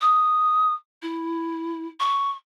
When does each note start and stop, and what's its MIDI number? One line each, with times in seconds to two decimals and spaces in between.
0.01 0.73 87
1.02 1.86 64
2.00 2.32 85